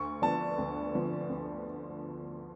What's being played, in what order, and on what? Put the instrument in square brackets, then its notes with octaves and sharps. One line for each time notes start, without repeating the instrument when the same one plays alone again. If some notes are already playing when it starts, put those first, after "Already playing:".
Already playing: [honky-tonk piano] D2 [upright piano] C#6
[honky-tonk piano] D3 F3 B3 D4 [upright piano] A5
[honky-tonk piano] D2
D3 F3 B3 D4
D2